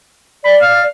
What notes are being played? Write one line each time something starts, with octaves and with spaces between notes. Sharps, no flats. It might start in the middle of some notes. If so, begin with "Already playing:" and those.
D5 B5
F5